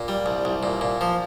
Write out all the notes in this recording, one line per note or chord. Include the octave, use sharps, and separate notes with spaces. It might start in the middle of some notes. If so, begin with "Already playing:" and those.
Already playing: A#2
G3
C2
C2
A#2
A#2
F3